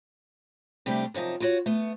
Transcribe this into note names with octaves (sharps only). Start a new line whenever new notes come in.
C3 G3 A3 D4 G4
F#2 C3 F3 D#4 A5
F4 F#4 C#5
A3 B3